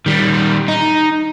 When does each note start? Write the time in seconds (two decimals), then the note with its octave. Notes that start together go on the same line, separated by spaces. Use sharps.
0.06 D#3 G3
0.68 D#4